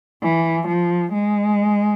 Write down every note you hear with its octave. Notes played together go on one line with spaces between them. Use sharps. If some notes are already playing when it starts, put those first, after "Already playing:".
E3
F3
G#3